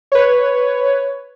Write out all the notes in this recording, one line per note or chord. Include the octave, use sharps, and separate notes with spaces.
B4 C#5